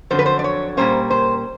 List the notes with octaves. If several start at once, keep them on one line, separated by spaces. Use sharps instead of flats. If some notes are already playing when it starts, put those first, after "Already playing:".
F2 D3 F#3 C5
B4
C5
D5
C#5
A#2 G3 A#3 C#4 C5
C5